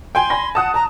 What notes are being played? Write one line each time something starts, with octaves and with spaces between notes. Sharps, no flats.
G5 G#5 C6
G#5 B5 A#6
F#5 A5 D#6 F#6
A5 A#5